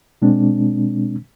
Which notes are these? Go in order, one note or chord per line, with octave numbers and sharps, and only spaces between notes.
B2 G#3 C4 D4